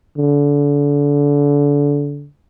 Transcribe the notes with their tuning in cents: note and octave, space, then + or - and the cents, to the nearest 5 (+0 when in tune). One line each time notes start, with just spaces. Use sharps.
D3 -30